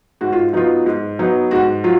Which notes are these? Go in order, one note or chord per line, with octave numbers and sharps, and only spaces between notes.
G#2 F#4
F4
F#3 B3 D#4 F4
G#2
F#3 B3 D#4
G#2 F#4
F#3 F4